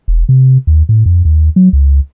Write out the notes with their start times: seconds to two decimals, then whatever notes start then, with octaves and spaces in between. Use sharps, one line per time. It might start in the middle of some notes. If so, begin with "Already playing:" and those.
0.08 E1
0.29 C3
0.67 D#2
0.89 A2
1.06 F2
1.25 D#2
1.56 F#3
1.73 C#2